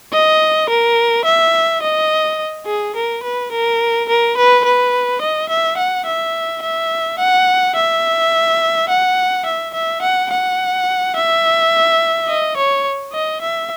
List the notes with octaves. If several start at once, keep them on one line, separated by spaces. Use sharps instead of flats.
D#5
A#4
E5
D#5
G#4
A#4
B4
A#4
A#4
B4
B4
D#5
E5
F#5
E5
E5
F#5
E5
F#5
E5
E5
F#5
F#5
E5
D#5
C#5
D#5
E5